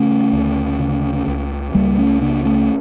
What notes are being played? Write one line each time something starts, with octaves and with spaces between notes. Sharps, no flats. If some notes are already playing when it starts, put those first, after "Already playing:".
Already playing: C#3 A3 C#4
D2
C#3
C#2
C#2 G3 A#3
A3 C#4
C#3 A#3 D4
A3 C#4